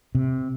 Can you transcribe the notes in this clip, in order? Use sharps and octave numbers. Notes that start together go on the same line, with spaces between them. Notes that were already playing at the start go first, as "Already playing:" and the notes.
C3